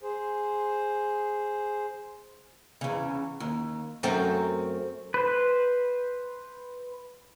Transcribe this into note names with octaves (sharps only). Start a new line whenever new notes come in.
G#4 C5
E2 C#3
D#2
F#2 A3 C4
B4 C5